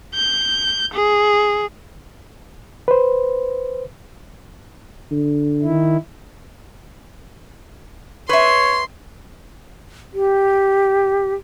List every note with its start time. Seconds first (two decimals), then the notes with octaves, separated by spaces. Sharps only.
0.14 G6
0.93 G#4
2.88 B4 C5
5.11 D3
5.63 D#3 E4
8.29 B4 C#5 E5 C6
10.14 G4